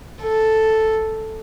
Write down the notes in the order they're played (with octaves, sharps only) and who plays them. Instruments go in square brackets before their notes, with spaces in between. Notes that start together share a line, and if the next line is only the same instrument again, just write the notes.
[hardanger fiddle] A4